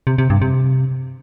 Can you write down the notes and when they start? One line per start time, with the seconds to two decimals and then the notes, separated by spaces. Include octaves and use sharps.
0.07 C3
0.18 C3
0.30 G2
0.42 C3